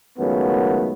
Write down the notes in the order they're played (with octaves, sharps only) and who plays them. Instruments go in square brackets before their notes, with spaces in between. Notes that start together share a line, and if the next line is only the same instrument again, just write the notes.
[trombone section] C#2 F#2 D#3 A3 B3